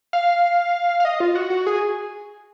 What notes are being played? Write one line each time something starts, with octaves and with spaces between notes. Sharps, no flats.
F5
F5
D#5
F4
F#4
F#4
G#4